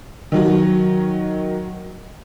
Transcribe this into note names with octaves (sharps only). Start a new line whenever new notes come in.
D#3 F#3 F#4